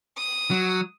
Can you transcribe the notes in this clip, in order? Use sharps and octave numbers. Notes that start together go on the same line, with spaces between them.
D#6
F#3